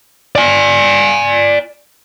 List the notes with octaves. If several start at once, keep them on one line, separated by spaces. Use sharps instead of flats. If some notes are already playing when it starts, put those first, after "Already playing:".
D5 G#5